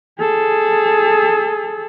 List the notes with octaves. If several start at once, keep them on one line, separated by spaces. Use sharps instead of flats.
G#4 A4